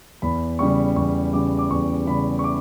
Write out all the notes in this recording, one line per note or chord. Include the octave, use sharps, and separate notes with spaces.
E2 B5
C#3 G3 C#6
E2 C#6
C#3 G3 D6
D6
E2 C#6
C#3 G3 B5
C#6
D6